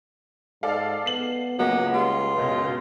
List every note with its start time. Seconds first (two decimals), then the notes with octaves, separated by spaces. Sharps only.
0.63 G#2 A4 D5 F5
1.06 B3 C7 F#7
1.59 C#2 F#3 G#3 A#3 B3
1.94 G3 F4
2.36 C#2 F#2 B2